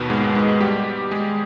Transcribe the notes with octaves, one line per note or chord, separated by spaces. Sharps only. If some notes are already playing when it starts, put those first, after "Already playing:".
Already playing: D#2 B2 D#3 B3
G#2 G#3
G#2 G#3
G3 G4
G#3 G#4